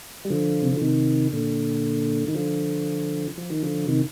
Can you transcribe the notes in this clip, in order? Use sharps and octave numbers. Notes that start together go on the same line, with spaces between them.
G3
D3 F3
C3
D3
C3 D#3
A#2 D3
D#3
D3 F3
F3
D#3
D3 F3
C3 D#3